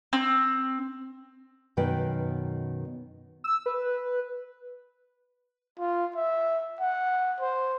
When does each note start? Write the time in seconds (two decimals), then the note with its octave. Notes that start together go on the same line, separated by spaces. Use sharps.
0.13 C4
1.77 F#2 B2 D#3 B4 G5
3.44 E6
3.66 B4
5.79 F4
6.16 E5
6.80 F#5
7.40 C5